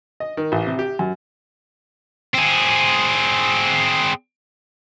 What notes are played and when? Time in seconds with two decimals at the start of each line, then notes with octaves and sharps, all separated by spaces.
0.20 D#5
0.37 D#3
0.52 A1
0.67 C3
0.79 G4
0.99 F#2
2.34 C4 G#4